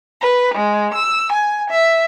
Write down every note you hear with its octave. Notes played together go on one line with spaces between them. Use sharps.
B4
G#3
E6
G#5
E5